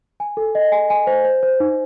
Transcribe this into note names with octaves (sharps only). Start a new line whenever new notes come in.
G#5
A4
D#5
G#5
G#5
C5
C5
C5
D#4